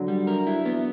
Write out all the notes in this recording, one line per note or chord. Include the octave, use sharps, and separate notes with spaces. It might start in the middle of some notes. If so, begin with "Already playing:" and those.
Already playing: D3 F#3
G3
A#4
E4
B3